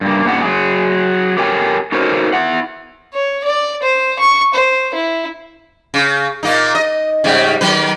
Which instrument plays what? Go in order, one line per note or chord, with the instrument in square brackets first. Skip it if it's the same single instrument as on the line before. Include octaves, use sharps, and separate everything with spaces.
[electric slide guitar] G2 A#3
G#2 A#3 D4 F#5
F#3 G#4
G4 A4 A#4 C#5 G5 G#5
D#4 F#4 A4 A#4 C5 C#5
E4 F#5
[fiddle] C#5
D5
C5
C#6
C5
E4
[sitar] C#3
A#2 A#3 D#4
D#5
G#2 C#3 G3
D#3 F#3 B4